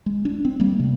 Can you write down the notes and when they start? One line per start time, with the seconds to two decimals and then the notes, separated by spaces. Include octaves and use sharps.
0.06 G#3
0.25 D4
0.45 C4
0.60 G3 A#3
0.79 C3